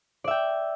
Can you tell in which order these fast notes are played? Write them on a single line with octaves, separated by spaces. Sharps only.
D5 E5 G5